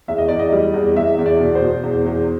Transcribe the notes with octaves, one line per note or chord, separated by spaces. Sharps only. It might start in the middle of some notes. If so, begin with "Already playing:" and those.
E2 E5
D#5
E2 D5
D#5
G3
E2
E2 E5
E2
D5
B2
C5
B2
E2
E2